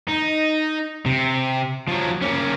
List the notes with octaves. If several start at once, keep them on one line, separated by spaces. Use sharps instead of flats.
D#4
C3
F3 F#3
A#3 C#4